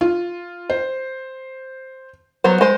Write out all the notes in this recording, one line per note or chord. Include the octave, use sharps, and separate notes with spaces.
F4
C5
F#3 B3 C5
G#3 C5